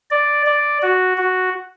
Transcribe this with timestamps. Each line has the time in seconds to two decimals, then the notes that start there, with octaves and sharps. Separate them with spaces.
0.11 D5
0.46 D5
0.82 F#4
1.17 F#4